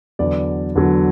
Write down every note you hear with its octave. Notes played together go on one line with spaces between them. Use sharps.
E2 D3 F#3 D5
E2 D3 F#3